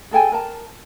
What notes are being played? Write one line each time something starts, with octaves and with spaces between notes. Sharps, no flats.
G#4 A4 G5 G#5
A#4 A5